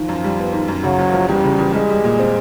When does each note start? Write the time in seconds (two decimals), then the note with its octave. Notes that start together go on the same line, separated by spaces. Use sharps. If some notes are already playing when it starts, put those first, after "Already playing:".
Already playing: D#3 F3
0.09 F#2
0.24 G3
0.39 B3
0.53 D#3
0.68 F#2
0.83 C#3 F#3
0.98 F#1
1.14 F3
1.29 E2 G3
1.44 C#3
1.58 E2
1.73 G3 G#3
1.90 G3
2.04 A#2
2.19 C4